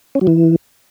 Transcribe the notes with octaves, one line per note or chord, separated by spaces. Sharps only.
C#4
F#3
E3